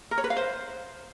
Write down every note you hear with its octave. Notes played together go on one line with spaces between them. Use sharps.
A#4
C#5
B4
F5
C5